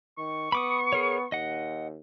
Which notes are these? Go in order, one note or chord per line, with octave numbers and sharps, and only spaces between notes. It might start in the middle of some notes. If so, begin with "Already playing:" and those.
D#3 C#6
B3 B5 D6 D#6
G#4 A#4 C#5
D#2 D#5 F#5